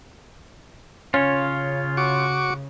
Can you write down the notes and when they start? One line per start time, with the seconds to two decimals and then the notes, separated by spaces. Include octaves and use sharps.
1.14 C#3 C#4 F4 C#5
1.97 F#4 C#6 D6